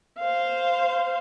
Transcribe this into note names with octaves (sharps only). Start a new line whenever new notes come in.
C5 F5